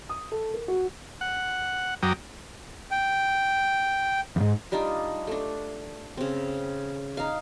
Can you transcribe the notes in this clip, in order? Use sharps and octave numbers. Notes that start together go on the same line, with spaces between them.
D#6
A4
A#4
F#4
F#5
F#2 F#3 G5 A#5 D6 D#6
G5
E2 G#2
G3 D4 D#4 F4
A3 D4
C#3 C4
D#4 F5